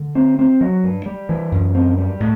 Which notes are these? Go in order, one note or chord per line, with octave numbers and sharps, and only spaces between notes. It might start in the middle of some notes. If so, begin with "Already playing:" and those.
Already playing: D3
C4
C4
F#3
G2
G3
E3
F#2
C4
G3
A2